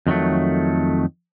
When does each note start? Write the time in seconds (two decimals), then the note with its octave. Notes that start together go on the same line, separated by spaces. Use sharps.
0.07 F2 D#3 F#3 A3